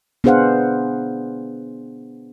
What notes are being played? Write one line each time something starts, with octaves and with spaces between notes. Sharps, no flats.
B3 D4 G#4 C5 F5 F#5